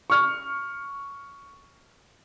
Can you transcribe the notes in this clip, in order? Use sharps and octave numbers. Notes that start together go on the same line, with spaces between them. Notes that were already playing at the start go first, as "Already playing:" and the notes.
C#6 F6